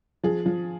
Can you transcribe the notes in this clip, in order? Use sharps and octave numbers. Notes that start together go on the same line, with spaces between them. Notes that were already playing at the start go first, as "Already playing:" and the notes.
F3 G#4
F3